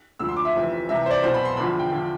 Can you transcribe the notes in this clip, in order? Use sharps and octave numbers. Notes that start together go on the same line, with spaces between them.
D2 D3 F3 E6
C6
D6
E5
F1 F2 E3
C2 C3 E3 E5
C5
D5
B1 B2 C5
B5
C6
E2 D3 F3 B5
G5
E2 D3 F3